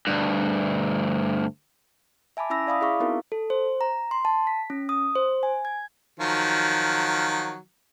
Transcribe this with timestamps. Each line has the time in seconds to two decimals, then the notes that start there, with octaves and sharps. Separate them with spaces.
0.07 D2 G2
2.37 E5 G#5 A5 B5 D6
2.50 C#4 E4 E5 B5 E6 A#6
2.67 D5 F5 B5 D#6
2.81 E4 G#4 E5 F5 C#6 D6
3.00 B3 C4 D#4 E4 F#4 A#4
3.32 A4
3.50 C5
3.81 A#5
4.11 C6
4.25 A5
4.47 B6
4.70 C#4
4.89 D#6
5.16 C5
5.43 G#5
5.65 G#6
6.20 D#3 F3 F#3